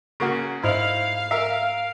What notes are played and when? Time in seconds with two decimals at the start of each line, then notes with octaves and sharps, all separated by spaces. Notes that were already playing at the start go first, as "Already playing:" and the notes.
0.20 C#3 A#3 F#4
0.64 G#2 D#4 E4 C5 F5
1.31 A#4 E5